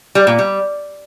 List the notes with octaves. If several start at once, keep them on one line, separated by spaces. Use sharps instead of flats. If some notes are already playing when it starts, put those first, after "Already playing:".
G3
A#2
G3